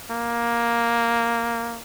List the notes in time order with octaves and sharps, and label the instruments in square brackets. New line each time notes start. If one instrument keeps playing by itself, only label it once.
[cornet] A#3